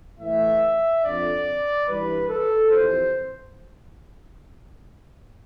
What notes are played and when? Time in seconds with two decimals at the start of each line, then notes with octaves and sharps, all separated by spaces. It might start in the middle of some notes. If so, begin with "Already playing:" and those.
0.19 A2 E3 E5
1.03 F2 D3 D5
1.87 G2 E3 B4
2.29 A4
2.71 F2 C3 E3 C5